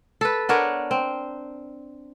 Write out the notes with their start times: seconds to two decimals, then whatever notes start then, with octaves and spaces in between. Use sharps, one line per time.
0.21 A4 B4
0.49 B3 D4 A#4 C#5
0.91 C4